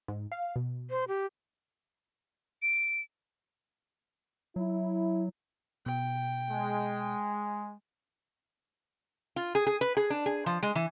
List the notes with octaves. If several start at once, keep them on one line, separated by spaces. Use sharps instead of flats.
G#2
F5
B2
C5
G4
D7
F#3 E4
B2 G5
G#3
F4
G#4
G#4
B4
G#4
D4
G#4
F3
G#3
E3